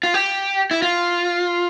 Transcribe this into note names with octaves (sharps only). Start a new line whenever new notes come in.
F4
G4
E4
F4